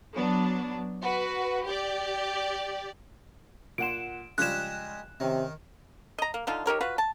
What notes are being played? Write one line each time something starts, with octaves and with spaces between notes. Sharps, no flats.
F#3 B3 D4
F#4 B4
G4 D5
A#2 F#5 C6 D7 E7
C#3 F3 G3 G#3 G4 G#4 F#6 E7
C3 D#3 C#4
D#5 A#5
A#3
D3 F3 D#4 F4
D#4 G4 A#4 C#5
F4 F#4 B4
A5